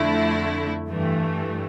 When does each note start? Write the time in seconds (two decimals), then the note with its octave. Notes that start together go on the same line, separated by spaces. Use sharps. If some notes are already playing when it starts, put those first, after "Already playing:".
Already playing: F2 D3 A3 E4
0.89 G2 E3 A3